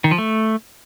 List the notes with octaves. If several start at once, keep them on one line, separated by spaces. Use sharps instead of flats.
D#3
F3
A3